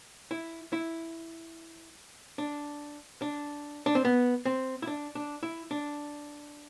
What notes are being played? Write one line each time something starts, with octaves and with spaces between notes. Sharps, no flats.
E4
E4
D4
D4
D4
C4
B3
C4
E4
D4
D4
E4
D4